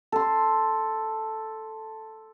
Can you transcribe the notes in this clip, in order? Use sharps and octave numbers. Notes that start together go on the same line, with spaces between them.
A4 C6